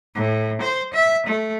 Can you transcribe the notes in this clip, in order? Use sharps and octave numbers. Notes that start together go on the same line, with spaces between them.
A2
C5
E5
A3